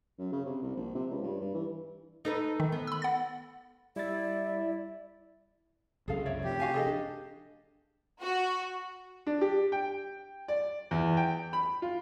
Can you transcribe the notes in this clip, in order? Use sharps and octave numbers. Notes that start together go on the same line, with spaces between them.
F#2
C#3
C3
C2
A#1
C3
C#2
G2
G2
E3
D#4 A4 B4
D#3
B3
B5 E6
F#5 A6
G3 E4 D5 A6
C2 F#2 C#3 G#4 A4 F5
C#5 D5 E5
C3 F3 G4
F#4 F5 G#5
G#4 A4 D#5
D4
F#4
D4
G4
G5
D5
E2
G5
B5
F4